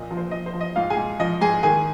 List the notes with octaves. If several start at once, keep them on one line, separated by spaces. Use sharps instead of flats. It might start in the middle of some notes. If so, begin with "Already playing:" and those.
Already playing: A#2 F3 D#5
F3
C5
F3 D#5
C5
F3
D#5
G#2 F4 F5
G#4 G#5
G#2
F3 D#5
G#2 G#4 G#5
D#3 G#4 G#5